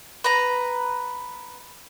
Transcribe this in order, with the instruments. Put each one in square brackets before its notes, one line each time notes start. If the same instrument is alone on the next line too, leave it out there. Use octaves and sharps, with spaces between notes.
[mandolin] B4 A#5